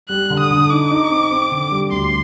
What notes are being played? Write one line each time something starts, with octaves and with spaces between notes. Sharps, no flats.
G3 F#6
D3
D#6
D3
D#4 D6
D#4
C4
C4
D3
G3
D2 C6